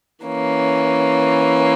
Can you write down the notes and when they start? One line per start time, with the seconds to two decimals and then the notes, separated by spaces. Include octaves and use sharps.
0.25 E3 A#3 C#4